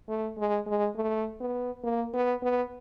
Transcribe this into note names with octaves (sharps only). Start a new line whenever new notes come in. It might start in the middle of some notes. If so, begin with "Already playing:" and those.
A3
G#3
G#3
A3
B3
A#3
B3
B3